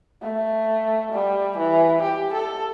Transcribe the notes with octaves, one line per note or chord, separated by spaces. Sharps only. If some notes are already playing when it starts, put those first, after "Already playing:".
A3
G3
E3
G4
A4